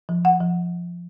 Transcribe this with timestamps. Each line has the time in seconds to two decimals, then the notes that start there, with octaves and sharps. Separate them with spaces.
0.09 F3
0.25 F#5
0.41 F3